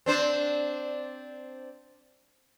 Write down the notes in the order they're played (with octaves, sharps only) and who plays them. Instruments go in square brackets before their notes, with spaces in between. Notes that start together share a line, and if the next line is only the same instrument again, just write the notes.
[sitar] C4 D4 C5